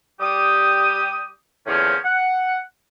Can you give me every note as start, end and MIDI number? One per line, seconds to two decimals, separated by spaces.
0.21 1.30 55
0.21 1.30 67
0.21 1.30 87
1.67 1.96 40
1.67 1.96 45
1.67 1.96 51
1.67 1.96 53
1.67 1.96 58
1.67 1.96 61
2.04 2.58 78